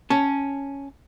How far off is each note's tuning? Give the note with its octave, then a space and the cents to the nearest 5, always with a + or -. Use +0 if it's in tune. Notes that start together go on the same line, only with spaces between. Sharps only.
C#4 +0 A5 +0